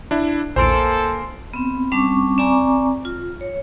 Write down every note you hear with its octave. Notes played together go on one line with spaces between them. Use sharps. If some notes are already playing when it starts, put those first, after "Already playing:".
D4 E4
A#1 E2 A#3 A4 C5 G#5 C6 D7
B3 C4
G3 C4 C#4 A5 C#6 D6
C4 D5 G#5 A#5 C#6 D6
F4
C#5